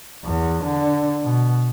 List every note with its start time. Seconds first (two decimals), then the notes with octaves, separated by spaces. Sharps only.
0.25 E2
0.64 D3
1.23 B2